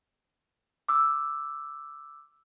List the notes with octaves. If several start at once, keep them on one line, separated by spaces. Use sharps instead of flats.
D6 E6